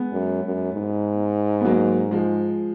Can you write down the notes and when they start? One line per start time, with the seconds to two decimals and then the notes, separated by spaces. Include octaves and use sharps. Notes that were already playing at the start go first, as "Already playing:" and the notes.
Already playing: G#3 B3
0.12 F#2
0.43 F#2
0.73 G#2
1.61 B3
1.65 F#3 A#3
2.11 F3 G#3